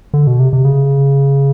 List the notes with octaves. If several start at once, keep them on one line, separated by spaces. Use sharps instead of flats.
D3
B2
C3
C3
C#3